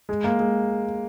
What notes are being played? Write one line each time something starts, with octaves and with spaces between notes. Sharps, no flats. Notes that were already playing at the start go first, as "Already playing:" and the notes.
G#3
A#3
G#3